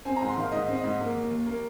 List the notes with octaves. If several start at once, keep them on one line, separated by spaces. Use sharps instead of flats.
C4 G#5
A#5
G#2
C6
D#3 F5
G#2 D#5
C4
D#5
G#2
A#3
D#2
D#2
A#3